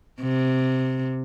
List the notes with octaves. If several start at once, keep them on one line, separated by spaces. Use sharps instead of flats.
C3